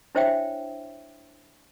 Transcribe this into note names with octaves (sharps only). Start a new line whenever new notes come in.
D4 E4 C5 C#5 E5 G5